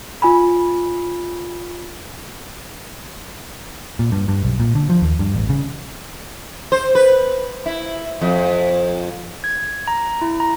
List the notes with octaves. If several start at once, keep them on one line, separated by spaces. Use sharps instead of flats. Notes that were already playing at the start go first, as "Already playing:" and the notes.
F4 G#5 B5
A#2
G2
G2
B1
A#2
D3
F3
D#2
G2
A1
C#3
C5
B4
E4
F2
G#6
A#5
E4
A#5